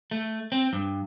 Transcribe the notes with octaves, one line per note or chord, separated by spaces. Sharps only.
A3
C4
G2